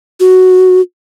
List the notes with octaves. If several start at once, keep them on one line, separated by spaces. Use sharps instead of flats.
F#4